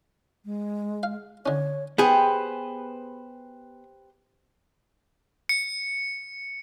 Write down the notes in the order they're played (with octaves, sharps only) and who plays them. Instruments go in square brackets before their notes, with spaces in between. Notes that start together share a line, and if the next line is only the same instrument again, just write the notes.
[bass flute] G#3
[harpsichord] F5
[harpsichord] D3 C#4 [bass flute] C#5
[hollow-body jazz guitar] B3 G#4 [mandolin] G4 B4 C5
[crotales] C#7